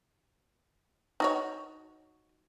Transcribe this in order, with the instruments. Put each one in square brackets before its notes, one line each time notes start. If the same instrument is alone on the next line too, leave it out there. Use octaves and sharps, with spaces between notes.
[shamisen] D#4 F#4 C#5